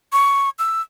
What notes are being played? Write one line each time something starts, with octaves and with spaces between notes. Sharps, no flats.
C#6
E6